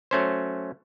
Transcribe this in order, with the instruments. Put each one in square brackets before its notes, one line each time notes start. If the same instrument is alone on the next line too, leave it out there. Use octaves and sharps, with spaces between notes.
[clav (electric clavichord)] F#3 A3 C#4 C5